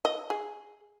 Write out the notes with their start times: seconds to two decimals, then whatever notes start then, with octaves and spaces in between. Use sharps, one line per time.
0.05 D#5
0.30 G#4